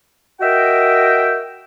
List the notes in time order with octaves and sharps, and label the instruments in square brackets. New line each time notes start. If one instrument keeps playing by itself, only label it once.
[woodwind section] F#4 A#4 D#5 E5 G5